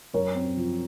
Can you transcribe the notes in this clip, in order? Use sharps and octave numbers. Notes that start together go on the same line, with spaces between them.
F#2 A#4 C#5
C4
F3